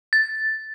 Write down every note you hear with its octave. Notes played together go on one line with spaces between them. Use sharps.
A6